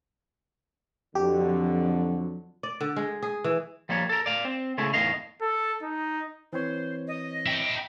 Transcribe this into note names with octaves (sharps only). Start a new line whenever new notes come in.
F2 D3 F#3 G4
D5
D3
G#3
G#4
E3
F3 G3 A#3 C#5
A4 A#4
D5 F5
C4
C#3 G#3 A3 E4
E2 A2 D#4 D#5 F5
A4
D#4
E3 C4 C5 C#5
D#5
E4 G5